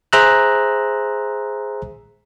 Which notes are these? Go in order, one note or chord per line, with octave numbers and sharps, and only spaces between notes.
G#4 C5 E5 A#5 E6 F#6